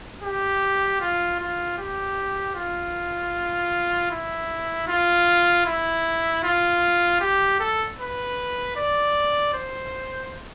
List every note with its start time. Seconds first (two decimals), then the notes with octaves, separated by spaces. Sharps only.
0.23 G4
1.01 F4
1.39 F4
1.78 G4
2.55 F4
4.11 E4
4.88 F4
5.66 E4
6.43 F4
7.21 G4
7.60 A4
7.99 B4
8.76 D5
9.54 C5